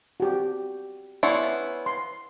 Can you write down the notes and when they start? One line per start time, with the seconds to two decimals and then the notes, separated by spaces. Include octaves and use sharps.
0.20 F#4 G4
1.23 B3 C#4 E4 D5 C6 C#6
1.86 C6